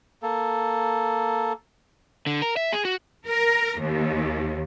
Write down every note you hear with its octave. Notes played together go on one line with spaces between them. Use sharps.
A#3 A4
D3
A#4
E5
G#4
F#4
A#4
D#2